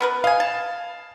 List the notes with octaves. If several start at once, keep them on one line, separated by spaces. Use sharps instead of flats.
B3 A#4 B4
D#5 F5 G#5
A5